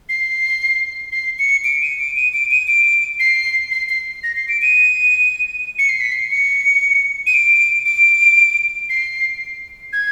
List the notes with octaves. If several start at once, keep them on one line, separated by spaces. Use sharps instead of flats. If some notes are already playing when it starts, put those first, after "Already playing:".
C7
C7
C#7
D7
D#7
D7
D#7
D7
D#7
D7
C7
C7
C7
A#6
C7
D7
D#7
C#7
C7
B6
C7
C#7
D#7
D7
D7
C7
G#6